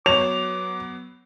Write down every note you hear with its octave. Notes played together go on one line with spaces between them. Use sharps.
F#3 B3 C#5 D6 F7